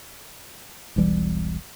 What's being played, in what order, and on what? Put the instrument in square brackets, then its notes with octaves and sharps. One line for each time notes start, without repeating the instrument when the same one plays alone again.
[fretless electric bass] E1 B1 E3 G3